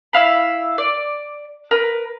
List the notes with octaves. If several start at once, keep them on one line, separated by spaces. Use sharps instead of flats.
E4 E5 F5 B5
D5
A#4 B4